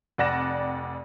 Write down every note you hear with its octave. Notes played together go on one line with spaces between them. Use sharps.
F1 F2 D5 F#5 A#6 E7